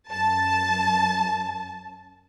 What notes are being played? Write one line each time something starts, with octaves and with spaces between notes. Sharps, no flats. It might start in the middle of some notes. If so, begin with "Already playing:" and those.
F#2 A5